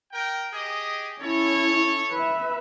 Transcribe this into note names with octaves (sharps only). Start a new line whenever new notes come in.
A#4 G5
G4 G#4 D#5
C#4 E4 A4 C#5
B4 E5